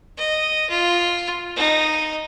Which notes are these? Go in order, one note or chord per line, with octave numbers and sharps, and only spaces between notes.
D#5
F4
D#4